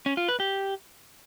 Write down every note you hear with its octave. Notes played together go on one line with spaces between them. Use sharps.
C#4
F4
B4
G4